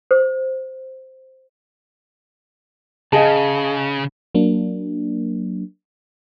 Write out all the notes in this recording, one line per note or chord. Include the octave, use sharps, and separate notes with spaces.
C5
C#3 G#4 D#5 F5 A5
F#3 A#3 D4